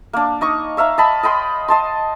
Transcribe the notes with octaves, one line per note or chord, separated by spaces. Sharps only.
A#3 D4
D#4 D#5 C#6
C#5 E5 F5 A#5
D#5 A5 B5
D#5 G5 B5 C6
D#5 A5 C6